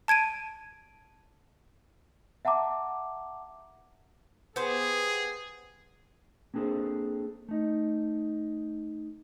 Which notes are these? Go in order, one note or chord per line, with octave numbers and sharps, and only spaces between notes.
A5 G#6 D7 D#7
E5 F#5 A5 A#5 D6
B3 G4 G#4 C5
A#3 C4 D4 G#4 A4 C5
A3 D#4